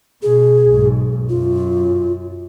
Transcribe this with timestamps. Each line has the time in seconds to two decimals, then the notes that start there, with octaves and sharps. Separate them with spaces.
0.23 B2 G#4
0.68 B1 G#2
1.29 F#2 F4